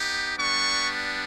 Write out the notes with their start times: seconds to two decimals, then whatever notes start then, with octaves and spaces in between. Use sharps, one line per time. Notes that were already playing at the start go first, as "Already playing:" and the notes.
Already playing: B3 D#4 G4
0.38 G3 B3 D4 C#6